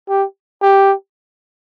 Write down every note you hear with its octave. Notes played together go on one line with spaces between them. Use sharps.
G4
G4